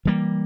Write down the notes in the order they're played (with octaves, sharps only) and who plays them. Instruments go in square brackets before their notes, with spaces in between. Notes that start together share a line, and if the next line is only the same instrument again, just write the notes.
[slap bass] E3 G3 A#3